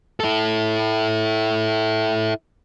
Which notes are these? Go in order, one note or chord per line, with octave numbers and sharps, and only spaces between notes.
E4 A4